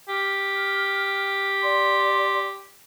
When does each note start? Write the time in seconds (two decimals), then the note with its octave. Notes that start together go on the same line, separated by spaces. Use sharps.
0.09 G4 F6
1.62 D5 C6